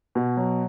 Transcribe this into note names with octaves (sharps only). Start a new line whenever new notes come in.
B2
F#3